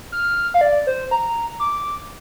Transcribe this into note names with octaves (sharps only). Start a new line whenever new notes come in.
F6
F5
D5
C5
A#5
D6